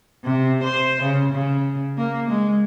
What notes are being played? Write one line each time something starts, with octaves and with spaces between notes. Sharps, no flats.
C3
C5
C#3
C#3
A#3
G#3